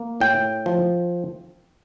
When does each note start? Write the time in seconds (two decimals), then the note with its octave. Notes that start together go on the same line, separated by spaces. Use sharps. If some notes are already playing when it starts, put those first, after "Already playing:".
Already playing: A#3
0.20 A2 G5
0.66 F3